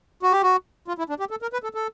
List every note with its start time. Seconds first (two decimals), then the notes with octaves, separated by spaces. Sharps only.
0.23 F#4
0.32 G4
0.43 F#4
0.88 F4
0.98 E4
1.09 D4
1.20 G4
1.31 A4
1.42 A#4
1.53 B4
1.63 A4
1.74 A4